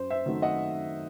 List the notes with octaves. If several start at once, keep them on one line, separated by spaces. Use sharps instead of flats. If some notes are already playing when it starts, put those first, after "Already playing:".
Already playing: F#2 C5
C5 E5
D#3 F#3 A3 C4
D#5 F#5